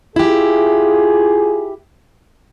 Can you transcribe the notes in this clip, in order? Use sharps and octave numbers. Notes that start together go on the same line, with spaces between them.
E4 F4 G4 G#4